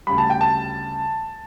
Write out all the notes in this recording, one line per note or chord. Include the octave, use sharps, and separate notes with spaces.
D2 C#3 G3 B5
A5
G5
A5